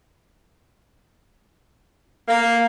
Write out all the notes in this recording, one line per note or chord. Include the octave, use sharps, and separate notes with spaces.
A#3